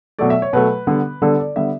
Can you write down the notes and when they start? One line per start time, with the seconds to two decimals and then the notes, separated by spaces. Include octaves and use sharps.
0.19 B2 F#3 A3 D5
0.30 E5
0.42 C#5
0.53 B2 F#3 A3 B4
0.87 D3 G3 B3
1.22 D3 G3 B3 A4
1.39 D5
1.56 D3 G3 B3 E5